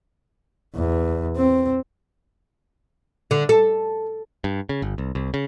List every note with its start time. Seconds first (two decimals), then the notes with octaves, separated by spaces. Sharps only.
0.75 E2
1.37 C4
3.31 D3
3.49 A4
4.44 G2
4.69 C#3
4.82 G1
4.98 C2
5.15 C2
5.34 C#3